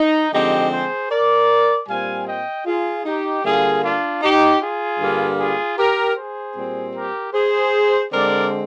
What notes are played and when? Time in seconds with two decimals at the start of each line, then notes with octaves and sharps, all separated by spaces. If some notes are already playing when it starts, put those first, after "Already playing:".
Already playing: D#4
0.32 D3 F3 G#3 C4 D#4 G4
0.71 G#4 C5
1.10 A#4 D5
1.87 A#2 G3 C4 F5 G#5
2.27 D#5 G5
2.65 F4 G#4
3.05 D#4 G4
3.43 D3 G3 A#3 F4 G#4
3.82 D4 F4
4.22 D#4 G4
4.60 F4 G#4
5.00 G2 D3 G3 A#3
5.39 F4 G#4
5.77 G4 A#4
6.16 G#4 C5
6.55 A#2 G3 C4
6.94 G4 A#4
7.33 G#4 C5
8.11 D3 G#3 C4 A#4 D5